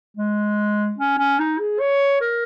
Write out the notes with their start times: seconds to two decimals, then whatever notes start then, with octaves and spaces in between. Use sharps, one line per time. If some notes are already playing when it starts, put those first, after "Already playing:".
0.17 G#3
0.99 C#4
1.18 C#4
1.39 D#4
1.59 G#4
1.80 C#5
2.21 A#4